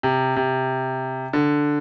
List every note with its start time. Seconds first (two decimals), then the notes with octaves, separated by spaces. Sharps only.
0.03 C3
0.36 C3
1.33 D3